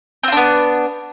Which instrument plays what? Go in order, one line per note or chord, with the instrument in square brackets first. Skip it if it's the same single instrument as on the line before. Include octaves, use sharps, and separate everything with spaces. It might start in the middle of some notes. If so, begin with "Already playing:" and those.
[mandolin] C4
F4
D4
B3